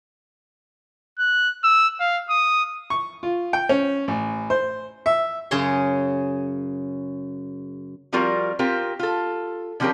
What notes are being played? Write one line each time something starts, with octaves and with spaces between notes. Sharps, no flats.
F#6
E6
F5
D#6
C#6
F4
G5
C#4
A1
C5
E5
F#2 C#3 G#4 C#5 C6
F3 G3 C4 F4 F#4 A#4
C4 F4 G4 A#4
F4 A4
D3 F3 C4 C#4 G4 A#4